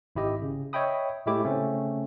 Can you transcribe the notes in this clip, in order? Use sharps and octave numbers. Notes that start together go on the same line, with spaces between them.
G#1 E4 G4 D#5
C#3
C#5 D#5 E5 G5 B5 D#6
A2 G#3 A3 E4 G4 D6
C#3 A3 C4 C#4